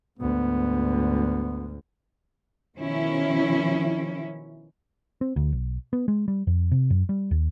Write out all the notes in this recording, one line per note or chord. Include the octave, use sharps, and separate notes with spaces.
D2 G#2 B3
B2 D#3 F3 C#4 E4
C4
D2
B1
B3
G#3
G3
F2
C3
F#2
G3
D#2